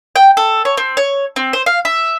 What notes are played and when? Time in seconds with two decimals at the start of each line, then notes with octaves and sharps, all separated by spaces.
0.16 G5
0.37 A4
0.65 C#5
0.77 C4
0.97 C#5
1.36 C4
1.53 C5
1.66 F5
1.85 E5